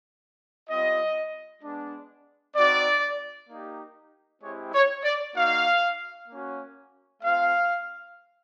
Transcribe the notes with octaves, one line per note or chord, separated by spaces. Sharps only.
G3 C4 F4 D#5
G#3 B3 D4
C4 D#4 F#4 D5
A#3 D#4 G4
G#3 C4 E4 G4 C#5
C#5
D5
A#3 D#4 F#4 F5
A#3 C#4 F#4
A3 C4 F4 F5